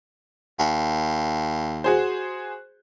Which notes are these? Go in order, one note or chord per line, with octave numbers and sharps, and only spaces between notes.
D#2
F#4 G#4 C5